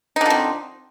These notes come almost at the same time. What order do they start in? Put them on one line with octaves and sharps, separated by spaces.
D#4 D3 F3 C4